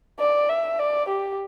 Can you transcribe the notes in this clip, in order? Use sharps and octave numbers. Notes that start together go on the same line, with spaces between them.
D5
E5
D5
G4